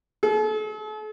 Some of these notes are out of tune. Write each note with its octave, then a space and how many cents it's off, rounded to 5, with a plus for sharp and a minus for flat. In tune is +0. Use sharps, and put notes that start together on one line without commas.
A4 -45